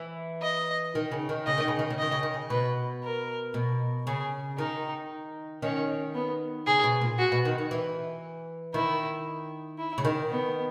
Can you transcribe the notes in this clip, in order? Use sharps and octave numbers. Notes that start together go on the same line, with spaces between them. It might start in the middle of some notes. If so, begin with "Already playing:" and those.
Already playing: E3
D#5
D#3
C#3
D#3
C#3 D#5
D#3
C#3
D#3
C#3
D#3 D#5
C#3
D#3
C#3
B2 B4
A#4
B2
C#3 G#4
D#3 D#4
D#3 C#4
B3
C#3 G#4
B2
A#2
F#4
B2
D#3
D#3
E3
D#3 E4
E4
C#3
D#3
B3